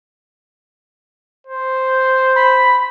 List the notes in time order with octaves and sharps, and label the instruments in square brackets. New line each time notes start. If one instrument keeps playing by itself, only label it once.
[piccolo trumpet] C5
[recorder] B5